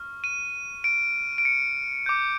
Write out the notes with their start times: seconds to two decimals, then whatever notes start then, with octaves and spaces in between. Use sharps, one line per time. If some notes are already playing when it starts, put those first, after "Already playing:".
Already playing: C#6 F6
0.24 D#7
0.84 D7
1.38 D7
1.45 C#7
2.06 D6 G6